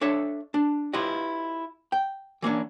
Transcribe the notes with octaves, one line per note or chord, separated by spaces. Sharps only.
D4 A4 C#5 E5
D4
E4 F4 G4 B4 D#5
G5
E3 A#3 C#4 D4